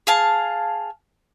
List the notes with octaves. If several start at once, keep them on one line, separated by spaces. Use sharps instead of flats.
G#4 F5 A5